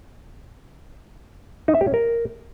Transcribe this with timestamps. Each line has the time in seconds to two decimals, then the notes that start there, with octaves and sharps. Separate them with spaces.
1.68 D#4
1.75 E5
1.81 G4
1.87 C#4
1.94 A#4